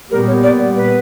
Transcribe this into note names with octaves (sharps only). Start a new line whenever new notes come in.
A#2 G3 B3 A#4
C#5
D5
B4